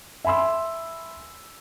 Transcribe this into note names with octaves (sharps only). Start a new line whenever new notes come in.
E5 G#5 B5 C6 E6